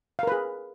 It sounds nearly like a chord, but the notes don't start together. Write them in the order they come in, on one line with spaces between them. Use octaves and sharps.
F5 A#4 B4 G#4